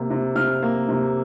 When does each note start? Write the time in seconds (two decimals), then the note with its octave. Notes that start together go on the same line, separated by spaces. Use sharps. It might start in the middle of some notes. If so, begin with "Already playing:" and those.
Already playing: C3 A#3
0.10 C3
0.35 C3 F6
0.62 A#3
0.89 C3